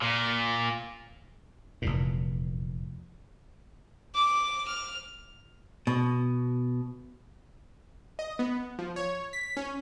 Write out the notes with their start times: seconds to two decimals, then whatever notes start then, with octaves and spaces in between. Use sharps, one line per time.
0.02 A#2
1.82 F1 E2 A#2
4.15 D6
4.68 F6
5.87 B2
8.19 D#5
8.39 B3
8.79 F3
8.96 C#5
9.33 B6
9.57 C#4